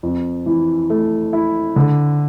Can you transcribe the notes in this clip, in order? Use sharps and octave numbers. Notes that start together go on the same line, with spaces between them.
F2
E3
A3
E4
D3